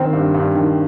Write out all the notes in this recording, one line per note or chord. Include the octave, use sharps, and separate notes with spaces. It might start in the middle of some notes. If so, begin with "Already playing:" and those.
Already playing: D#3 C4 C5
G2
G2
D#3